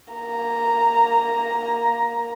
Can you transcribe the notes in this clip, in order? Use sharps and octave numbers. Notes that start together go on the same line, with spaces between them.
A#3 A#5